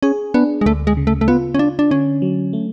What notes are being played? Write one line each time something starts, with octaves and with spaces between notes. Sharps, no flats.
C#4 G#4
B3 D4
G#3
D2 A3
G#3
C#3
A3
A3
B3 F4
C#4
D4 F4
D4
D3 C#4
F#3
A3